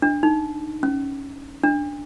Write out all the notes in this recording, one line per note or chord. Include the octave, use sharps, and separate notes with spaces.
D4
D#4
C#4
D4